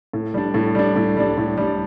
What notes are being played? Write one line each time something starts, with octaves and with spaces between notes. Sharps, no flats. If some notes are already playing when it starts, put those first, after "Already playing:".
A2
G3 D4
A2
G3 D4
A2
G3 D4
A2
G3 D4